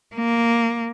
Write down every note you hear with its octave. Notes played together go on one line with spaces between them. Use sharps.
A#3